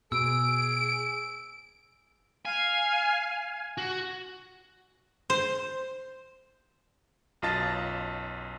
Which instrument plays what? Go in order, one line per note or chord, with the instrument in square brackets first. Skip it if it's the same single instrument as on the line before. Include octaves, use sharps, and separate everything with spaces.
[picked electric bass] B2 [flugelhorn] G#4 [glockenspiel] E6 [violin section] D7
[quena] F5 [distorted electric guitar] G#5
[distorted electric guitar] F#4
[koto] C5
[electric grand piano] B1 F#2 F4 D#5 A5 A6